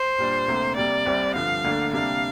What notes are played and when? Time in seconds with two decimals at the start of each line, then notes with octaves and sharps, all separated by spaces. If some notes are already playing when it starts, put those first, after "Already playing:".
Already playing: C5
0.18 A#2 G3 D4
0.47 D2 C3 A#3
0.77 C3 G3 A#3 D5
1.06 C2 C3 G3 C4
1.35 G2 D3 F3 F5
1.64 D2 D3 A#3 D4
1.93 C3 G3 A#3 D4 F5